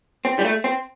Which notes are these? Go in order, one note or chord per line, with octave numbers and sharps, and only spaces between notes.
C4
G3
A3
C4